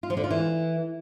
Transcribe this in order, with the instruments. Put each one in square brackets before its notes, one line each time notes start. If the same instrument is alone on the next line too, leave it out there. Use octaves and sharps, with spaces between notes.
[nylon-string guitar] F4
F3
D3
F4
E3